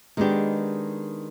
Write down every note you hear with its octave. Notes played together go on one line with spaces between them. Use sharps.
D#3 G#3 B3 D4 G4